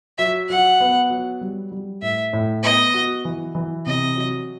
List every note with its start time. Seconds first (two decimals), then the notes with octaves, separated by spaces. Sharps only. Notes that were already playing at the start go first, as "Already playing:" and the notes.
0.18 F#3 E5
0.49 F#3 F#5
0.80 B3
1.10 F#3
1.41 G3
1.72 G3
2.02 A2 E5
2.33 A2
2.63 B3 D#5
2.94 F#4
3.25 E3
3.55 E3
3.86 C3 D#5
4.17 F#3